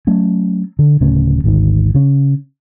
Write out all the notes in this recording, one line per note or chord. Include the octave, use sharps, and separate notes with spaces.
F#3 A3 C#4
D3
D1 C#3 A3 C#4
G#1 D2 G#2 D#3
C#3 C#4